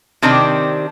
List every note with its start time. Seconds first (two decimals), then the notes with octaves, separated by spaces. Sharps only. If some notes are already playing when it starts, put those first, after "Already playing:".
0.22 C3 D#3 C4 D4